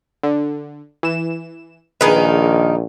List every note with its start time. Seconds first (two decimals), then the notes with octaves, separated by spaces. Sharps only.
0.23 D3
1.03 E3 E7
2.01 A#1 D#3 D#4 G#4 B4